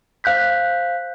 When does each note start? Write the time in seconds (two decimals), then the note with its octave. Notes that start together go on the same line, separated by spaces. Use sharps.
0.24 C5 F5 F#6 G6 B6